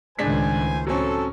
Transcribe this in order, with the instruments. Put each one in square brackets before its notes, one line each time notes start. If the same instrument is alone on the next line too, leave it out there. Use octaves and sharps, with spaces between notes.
[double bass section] C#2 A2 D#3 [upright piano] G#3 D4 B6 [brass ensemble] C5 G#5
[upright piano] F#3 C4 C#4 [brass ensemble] A4